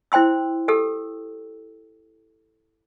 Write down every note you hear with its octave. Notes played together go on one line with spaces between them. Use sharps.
E4 C5 G5 C6 E6
G4 A4 E6